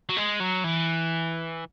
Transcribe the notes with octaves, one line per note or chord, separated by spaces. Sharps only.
F#3
G#3
F#3
E3